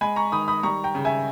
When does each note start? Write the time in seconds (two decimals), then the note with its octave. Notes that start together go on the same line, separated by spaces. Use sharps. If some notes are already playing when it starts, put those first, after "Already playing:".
0.01 G#3 G#5 B5
0.16 A#5 C#6
0.32 D#3 B5 D#6
0.48 B5 D#6
0.63 G3 A#5 C#6
0.84 G5 A#5
0.95 C#3
1.05 E5 G#5